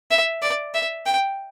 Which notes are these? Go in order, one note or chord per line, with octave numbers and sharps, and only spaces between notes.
E5
D5
E5
G5